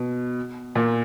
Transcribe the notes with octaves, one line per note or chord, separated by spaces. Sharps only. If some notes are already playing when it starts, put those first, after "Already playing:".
Already playing: B2
A#2